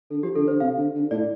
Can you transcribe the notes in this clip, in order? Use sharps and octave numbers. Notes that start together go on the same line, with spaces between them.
D3 A4
F3 G4
D3 A4
D3 C5
C3 F5
D3
D3
A2 D5